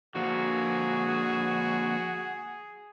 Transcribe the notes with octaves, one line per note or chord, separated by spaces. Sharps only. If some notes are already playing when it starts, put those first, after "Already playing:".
D3 F3 A#3 F#4 G#4